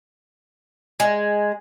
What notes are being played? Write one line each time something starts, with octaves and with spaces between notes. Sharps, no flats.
G#3